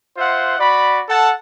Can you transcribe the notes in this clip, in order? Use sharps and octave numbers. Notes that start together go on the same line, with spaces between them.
F4 C5 E5 F#5
F#4 D5 B5
A4 F#5 A5